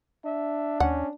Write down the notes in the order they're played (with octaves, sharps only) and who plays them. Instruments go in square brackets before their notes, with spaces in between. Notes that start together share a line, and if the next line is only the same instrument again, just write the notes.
[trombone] D4 [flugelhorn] E5
[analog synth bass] D#2 [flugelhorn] C#4 [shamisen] F#5